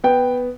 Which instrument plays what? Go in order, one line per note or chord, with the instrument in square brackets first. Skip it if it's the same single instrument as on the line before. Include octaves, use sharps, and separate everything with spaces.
[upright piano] B3 G5